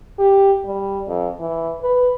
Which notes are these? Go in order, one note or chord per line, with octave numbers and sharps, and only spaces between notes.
G4
G3
F2
E3
B4